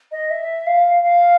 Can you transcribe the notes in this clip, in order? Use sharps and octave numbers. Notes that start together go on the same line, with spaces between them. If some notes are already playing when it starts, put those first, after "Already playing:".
D#5
E5
F5
F5